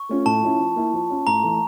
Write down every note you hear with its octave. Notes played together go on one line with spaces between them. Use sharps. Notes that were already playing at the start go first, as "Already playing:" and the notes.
Already playing: C#6
A3 C#4 F4
A2 A5
F3 C#4 E4
F3
A#3 E4
F3
C#4 F4
A2 A#5
E3 A3